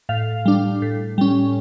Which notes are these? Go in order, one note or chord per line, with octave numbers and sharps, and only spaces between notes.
A2 F5
G3 D4
A2
G3 C#4